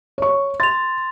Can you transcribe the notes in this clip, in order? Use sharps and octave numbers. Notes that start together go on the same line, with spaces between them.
C#5 C#6
C6 A6 F7